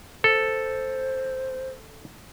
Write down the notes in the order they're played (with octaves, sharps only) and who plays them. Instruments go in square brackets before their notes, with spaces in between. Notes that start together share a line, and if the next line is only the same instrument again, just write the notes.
[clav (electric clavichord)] A4 [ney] C5